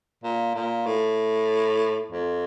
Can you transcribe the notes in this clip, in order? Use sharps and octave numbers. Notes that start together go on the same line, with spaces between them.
A#2
A#2
A2
F2